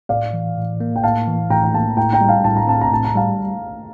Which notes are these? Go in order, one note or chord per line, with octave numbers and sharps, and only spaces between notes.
A2 D5 F5
E3
A2
A#3
G5
A2 F5 A5
E3
A2 G5 A#5
G5
A#3 F5 A5
A2 G5 A#5
G5 A#5
G3
F5 A5
A2 A5
A#5
C4 A5
A#5
A2 A5
A#5
G3 F5 A5